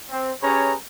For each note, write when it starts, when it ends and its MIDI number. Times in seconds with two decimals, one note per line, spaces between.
0.11 0.31 60
0.42 0.74 61
0.42 0.74 67
0.42 0.74 68
0.42 0.74 71
0.42 0.74 73
0.42 0.74 82